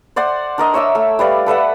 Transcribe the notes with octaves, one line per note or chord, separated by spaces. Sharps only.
C5 D5 F#5 C6
D4 A#4 D#5
C#5 E5 D6 E6
A3
G3 B4 D5 F5
A4 B4 E5 F#5